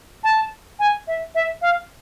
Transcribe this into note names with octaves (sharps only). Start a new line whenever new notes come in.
A5
G#5
E5
E5
F5